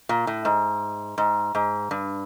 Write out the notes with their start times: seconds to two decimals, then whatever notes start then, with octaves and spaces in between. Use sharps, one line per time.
0.09 A#2
0.27 A2
0.45 G#2
1.18 G#2
1.55 G#2
1.91 G2